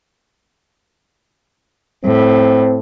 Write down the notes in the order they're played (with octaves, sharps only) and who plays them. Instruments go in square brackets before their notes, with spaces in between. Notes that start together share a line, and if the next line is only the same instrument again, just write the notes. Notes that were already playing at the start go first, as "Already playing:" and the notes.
[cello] A2 [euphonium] C4